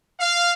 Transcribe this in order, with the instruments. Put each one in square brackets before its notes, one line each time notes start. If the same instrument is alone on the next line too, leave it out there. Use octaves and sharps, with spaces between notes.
[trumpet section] F5